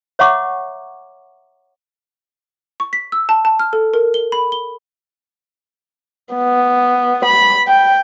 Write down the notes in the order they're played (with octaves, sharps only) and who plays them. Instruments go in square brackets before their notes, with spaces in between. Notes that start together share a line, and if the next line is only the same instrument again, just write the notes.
[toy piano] C#5 E5 F#5 A#5 C#6 D6
[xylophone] C#6
B6
E6
A5
A5
F6
A4
A#4
G7
B5
G7
[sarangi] B3
B5
G5